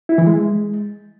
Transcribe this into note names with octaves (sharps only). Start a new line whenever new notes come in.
E4
E3
G#3